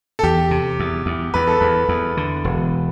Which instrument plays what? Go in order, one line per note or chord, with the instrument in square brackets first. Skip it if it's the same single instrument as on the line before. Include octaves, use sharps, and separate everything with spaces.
[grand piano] A4
[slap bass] E2 [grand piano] G4
[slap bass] C3
E2
E2
[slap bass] E2 [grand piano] B4
[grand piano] A4
[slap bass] E2 [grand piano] B4
[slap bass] E2
D3
E1